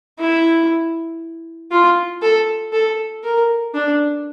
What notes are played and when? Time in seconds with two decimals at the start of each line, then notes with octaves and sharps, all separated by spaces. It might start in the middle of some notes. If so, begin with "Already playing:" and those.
0.19 E4
1.71 F4
2.22 A4
2.73 A4
3.24 A#4
3.74 D4